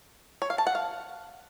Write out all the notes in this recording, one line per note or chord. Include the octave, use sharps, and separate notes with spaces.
C#5
F5
A5
F#5
F5